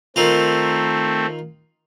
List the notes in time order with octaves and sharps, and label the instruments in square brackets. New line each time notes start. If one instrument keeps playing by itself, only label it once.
[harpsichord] D#3 F4 [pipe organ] A3 C4